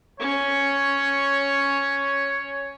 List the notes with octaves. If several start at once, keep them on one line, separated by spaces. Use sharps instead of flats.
C#4 C#5